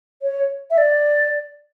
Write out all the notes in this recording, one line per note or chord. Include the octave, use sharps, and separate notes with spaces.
C#5
E5
D5